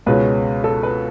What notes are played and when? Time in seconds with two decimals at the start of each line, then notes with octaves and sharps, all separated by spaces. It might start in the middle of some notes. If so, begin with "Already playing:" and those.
0.06 C#2 B2 G#3 C#4 B4
0.64 A4
0.83 B4